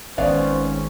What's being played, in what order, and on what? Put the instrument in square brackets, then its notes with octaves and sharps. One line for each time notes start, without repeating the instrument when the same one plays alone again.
[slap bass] G#1 [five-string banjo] B3 D5 F5 [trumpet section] C#4 [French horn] C5